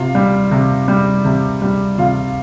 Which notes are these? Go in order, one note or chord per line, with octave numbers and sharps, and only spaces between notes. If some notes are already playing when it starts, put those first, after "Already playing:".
Already playing: C3 F4
G3
C3
G3
C3
G3
C3 F4